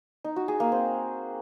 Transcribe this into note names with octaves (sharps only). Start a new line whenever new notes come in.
D#4
F#4
G#4
A#3
C4